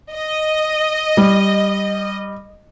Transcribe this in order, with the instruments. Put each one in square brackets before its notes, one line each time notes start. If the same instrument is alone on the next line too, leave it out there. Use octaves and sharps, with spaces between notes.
[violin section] D#5
[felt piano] G3